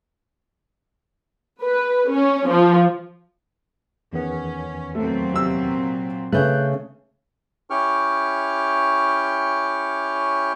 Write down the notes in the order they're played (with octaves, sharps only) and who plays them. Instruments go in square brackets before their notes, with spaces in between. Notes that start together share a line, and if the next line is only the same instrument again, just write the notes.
[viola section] B4
C#4
F3
[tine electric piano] E2 D#3 B3 [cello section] C#4
[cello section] A#2 F#3 C4 [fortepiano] A3
[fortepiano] C3 E6
[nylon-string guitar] C#3 A3 [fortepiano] B4 [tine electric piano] F#6 G6
[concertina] C#4 E4 G4 G5 C#6 F6